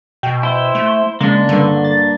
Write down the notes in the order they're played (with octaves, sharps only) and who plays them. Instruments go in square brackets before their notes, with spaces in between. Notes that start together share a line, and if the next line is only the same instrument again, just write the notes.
[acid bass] B2 [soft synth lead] G5
[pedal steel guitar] E4 C5
[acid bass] A3
[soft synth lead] C#3 [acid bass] G#3 [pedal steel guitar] A#3 D4
[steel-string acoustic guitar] G2 [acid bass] D3
[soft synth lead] A6